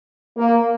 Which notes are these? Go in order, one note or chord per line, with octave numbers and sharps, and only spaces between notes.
A#3